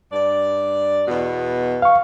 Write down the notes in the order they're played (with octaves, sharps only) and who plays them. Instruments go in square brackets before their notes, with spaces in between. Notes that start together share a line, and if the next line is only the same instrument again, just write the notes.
[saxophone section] G2 D5
E2 B2
[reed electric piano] F5 C#6